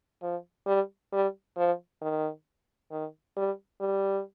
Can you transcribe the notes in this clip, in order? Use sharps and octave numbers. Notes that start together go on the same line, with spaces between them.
F3
G3
G3
F3
D#3
D#3
G3
G3